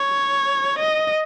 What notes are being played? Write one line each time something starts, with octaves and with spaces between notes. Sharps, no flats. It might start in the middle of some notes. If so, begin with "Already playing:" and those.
Already playing: C#5
D#5